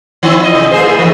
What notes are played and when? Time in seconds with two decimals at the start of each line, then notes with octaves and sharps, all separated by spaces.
0.23 D#3 C4 E4
0.40 F4 D#5
0.55 C3
0.71 A#3 G#4 C5
0.84 A#3 E4 G#4
0.98 G#2 D#3 E3